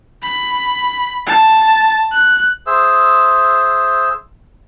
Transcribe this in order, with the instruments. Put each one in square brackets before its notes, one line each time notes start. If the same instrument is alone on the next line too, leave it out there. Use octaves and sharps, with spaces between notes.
[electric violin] B5
A5
F#6
[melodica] G#4 C5 E5 E6